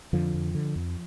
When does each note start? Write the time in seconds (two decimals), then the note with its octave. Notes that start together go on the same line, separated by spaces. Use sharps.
0.13 F2 D3 F3
0.34 F2
0.55 D3
0.76 F2